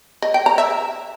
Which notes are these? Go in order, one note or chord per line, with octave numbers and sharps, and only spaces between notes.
D#5
G5
A#5
E5